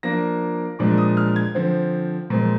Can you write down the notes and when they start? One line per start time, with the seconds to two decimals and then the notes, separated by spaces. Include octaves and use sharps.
0.03 F3 A#3 D4 A#6
0.79 A#2 F3 G#3 D4 D6
0.98 D#6
1.17 F6
1.36 G#6
1.55 D3 F3 C4
2.30 A#2 F3 G#3 C4